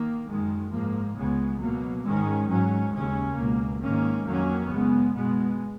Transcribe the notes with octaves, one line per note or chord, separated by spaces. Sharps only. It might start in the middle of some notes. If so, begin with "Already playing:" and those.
Already playing: D#3 A#3
F#2 D#3 G#3
G#2 F3 A#3
C#2 C#3 G#3 B3
B2 F#3 A#3
G#2 D#3 G#3 C#4
G#2 F#3 C#4
D#2 C#3 G#3 C#4
C#2 B2 A#3
G#2 D#3 A#3 C#4
F2 D#3 F#3 A#3 C#4
F#2 C#3 G#3 B3
B2 G#3 B3